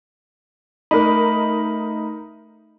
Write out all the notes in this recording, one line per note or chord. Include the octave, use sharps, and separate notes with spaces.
A3 D#4 A#4 B5